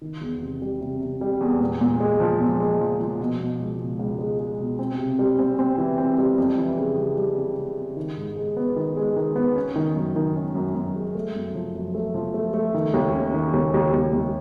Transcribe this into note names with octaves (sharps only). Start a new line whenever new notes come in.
D#3
E2
C3
G3
C3
C3
G3
E2
A#2
A#2
G#3
F3
A#2
G#3
F3
F3
B2
B2
C#2
B2
C#2
G#3
G#3
B2
C4
C3
G3
C4
C4
E3
C4
G3
F2
E3
C#3
G3
G3
C#3
C#3
C#3
D#3
G#2
G#3
B3
D#3
G#3
D#3
B3
C#4
D#3
F#2
D#3
C#4
F#2
F#2
G#3
A3
F#2
F3
F#2
A3
F3
A3
A3
D#3
D#2
C#4
D#3
D#2
D#2
D#2
D#2